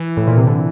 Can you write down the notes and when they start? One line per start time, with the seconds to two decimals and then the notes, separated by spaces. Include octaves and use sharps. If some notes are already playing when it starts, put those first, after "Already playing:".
Already playing: E3
0.17 A2
0.27 A#2
0.38 C3
0.47 D3